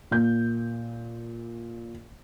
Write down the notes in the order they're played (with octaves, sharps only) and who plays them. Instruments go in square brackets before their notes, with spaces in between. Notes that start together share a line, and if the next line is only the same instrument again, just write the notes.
[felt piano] A#2 G6